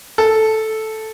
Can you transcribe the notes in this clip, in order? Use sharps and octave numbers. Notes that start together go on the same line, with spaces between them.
A4